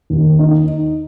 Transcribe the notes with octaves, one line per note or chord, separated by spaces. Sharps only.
D#2
D#4